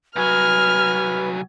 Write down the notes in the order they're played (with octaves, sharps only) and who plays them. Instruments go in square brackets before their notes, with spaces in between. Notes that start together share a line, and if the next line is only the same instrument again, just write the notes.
[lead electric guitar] C2 F#3 [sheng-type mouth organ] B4 [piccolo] G#5 [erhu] F6